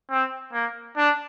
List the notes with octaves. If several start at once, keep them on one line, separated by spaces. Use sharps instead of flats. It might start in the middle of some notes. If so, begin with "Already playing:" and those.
C4
A#3
D4